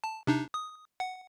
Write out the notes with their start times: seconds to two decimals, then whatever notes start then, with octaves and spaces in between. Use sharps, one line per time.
0.04 A5
0.27 C3 D4 D#4
0.54 D#6
1.00 F#5